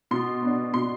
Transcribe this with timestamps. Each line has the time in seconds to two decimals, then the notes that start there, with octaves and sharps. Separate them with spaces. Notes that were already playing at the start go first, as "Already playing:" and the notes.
0.11 B2 C6
0.42 B3 D4
0.74 B2 C6